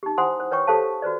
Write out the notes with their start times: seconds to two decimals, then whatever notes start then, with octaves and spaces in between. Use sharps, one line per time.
0.03 D#4 G4
0.18 E4 C5 F#5 G#5 C6 D#6
0.40 C5
0.51 B4 C#5 G5 C#6
0.67 G4 A4 C5 F5 A5
1.02 F#4 B4 C5 D5